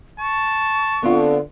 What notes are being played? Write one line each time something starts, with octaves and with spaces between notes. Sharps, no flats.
A5 C#6
D3 B3 C4 F4